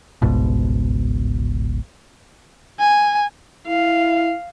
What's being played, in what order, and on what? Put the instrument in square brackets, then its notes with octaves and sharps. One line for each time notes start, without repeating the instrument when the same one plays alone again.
[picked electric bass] G1 C#2 G#2 B2
[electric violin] G#5
[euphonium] E4 [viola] F5